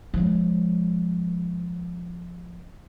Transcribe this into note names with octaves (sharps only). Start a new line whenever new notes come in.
F3 G#3